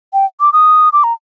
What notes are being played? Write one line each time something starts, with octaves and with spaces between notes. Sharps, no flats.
G5
D6
D#6
D6
A#5